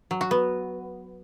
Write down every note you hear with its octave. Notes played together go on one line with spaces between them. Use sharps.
F#3
F#4
B3